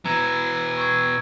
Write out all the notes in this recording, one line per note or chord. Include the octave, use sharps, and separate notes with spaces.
B2 E3 A#5 E6 G#6
C#6 E6 G#6